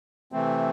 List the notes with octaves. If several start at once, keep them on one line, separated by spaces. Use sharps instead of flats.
C3 E3 A3 C4